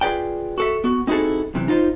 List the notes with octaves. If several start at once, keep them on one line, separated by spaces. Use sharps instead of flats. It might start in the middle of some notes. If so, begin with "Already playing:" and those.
F4 G#4 B4 D5 G5
F#4 A4 E5
B3 F#4
C4 D#4 E4 F#4 G#4 A4
F#2 C3 E3
D#4 F4 C5